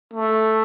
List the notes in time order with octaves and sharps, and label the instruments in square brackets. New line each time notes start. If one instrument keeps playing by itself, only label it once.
[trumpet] A3